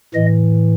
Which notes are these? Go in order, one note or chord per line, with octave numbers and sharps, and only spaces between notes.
A2 E3 D#5